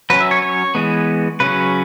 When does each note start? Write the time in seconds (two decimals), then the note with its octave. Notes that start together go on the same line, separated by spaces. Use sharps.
0.10 F#3 C#4 B4
0.20 E5
0.31 C#5
0.42 C#5
0.75 E3 G#3 B3
1.40 C#3 F#3 C#4 B4